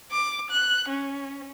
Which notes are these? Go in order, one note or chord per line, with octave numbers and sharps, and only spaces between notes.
D6
F#6
C#4